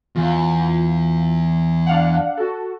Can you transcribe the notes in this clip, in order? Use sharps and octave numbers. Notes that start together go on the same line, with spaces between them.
E2 F4
D4 F5 F#5
F#4 A4